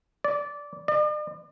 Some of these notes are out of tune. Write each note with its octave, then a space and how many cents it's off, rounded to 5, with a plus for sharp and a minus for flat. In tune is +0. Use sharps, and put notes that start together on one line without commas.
D5 -15
D5 +45